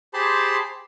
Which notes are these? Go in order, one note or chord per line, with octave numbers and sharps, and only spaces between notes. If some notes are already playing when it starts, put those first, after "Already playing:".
G4 G#4 C5 A5 B5 C6